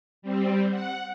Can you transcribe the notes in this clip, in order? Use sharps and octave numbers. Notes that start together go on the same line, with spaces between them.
G3 C4
F#5